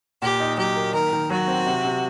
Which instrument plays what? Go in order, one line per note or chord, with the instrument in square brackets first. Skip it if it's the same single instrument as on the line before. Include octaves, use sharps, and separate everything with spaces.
[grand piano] A#2 [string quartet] G4
[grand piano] D#4
[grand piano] F#3 [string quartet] G4
[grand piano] A#3
[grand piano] D#3 [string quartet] A#4
[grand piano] D#3
[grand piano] F#3 [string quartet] F#4
[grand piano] C4
C3
C3